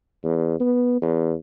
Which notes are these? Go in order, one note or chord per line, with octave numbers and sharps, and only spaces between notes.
E2
B3
E2